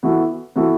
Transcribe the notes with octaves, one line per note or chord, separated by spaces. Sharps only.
E3 B3 F#4 A4
E3 B3 F#4 A4